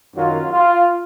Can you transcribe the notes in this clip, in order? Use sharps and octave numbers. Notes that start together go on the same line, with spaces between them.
F#2 D#3 F#3 F4
F4